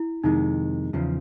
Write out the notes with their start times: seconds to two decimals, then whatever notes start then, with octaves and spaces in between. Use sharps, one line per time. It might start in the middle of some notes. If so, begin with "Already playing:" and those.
Already playing: E4
0.24 F2 C3 D#3 G#3 D#4
0.93 E2 C#3 F3